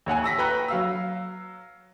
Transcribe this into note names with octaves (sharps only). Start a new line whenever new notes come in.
D#2 C#5 F#5 G#5
C#6 E6 A#6 B6
B4 G5 A#5 B5 C#6 F#6
F#3 F5 E6